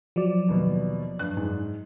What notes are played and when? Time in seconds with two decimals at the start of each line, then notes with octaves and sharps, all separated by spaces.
0.16 F3 F#3 D5
0.49 D#2 B2
1.19 G2 F#6
1.37 G#2